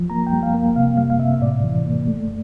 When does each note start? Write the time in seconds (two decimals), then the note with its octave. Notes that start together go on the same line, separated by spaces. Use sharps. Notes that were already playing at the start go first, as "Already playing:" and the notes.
Already playing: F3
0.10 A#3 A#5
0.27 G5
0.32 G3
0.43 F5
0.54 A#3
0.76 C3 F5
0.97 G3 F5
1.10 F5
1.19 C3 E5
1.34 E5
1.42 A2 D5
1.64 E3
1.86 A#3
2.08 A3